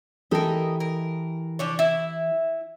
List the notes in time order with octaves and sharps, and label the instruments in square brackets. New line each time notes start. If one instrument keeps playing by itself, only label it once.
[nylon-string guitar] E3 G4 A4 [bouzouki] A#4 D#5
[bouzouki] A#4
F3 D4 C#5
E4